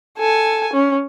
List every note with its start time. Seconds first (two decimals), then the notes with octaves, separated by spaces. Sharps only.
0.18 A4 G#5
0.73 C#4